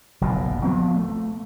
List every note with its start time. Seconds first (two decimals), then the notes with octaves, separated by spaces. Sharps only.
0.21 F#1 B1 F2 A#2
0.64 F3 F#3 B3 C4
0.96 A3